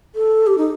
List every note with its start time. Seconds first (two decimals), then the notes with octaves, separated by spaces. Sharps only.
0.15 A4
0.47 G4
0.58 D#4